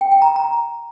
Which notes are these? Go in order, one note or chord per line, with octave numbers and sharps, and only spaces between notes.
G5
G5
A#5
A#5